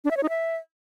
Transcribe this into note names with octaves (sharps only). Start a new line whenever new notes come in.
D4
E5
C#5
D#4
E5